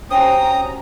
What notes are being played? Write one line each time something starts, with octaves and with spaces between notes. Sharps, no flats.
C4 C#4 F#4 G4 C5 G5 A#5 D#6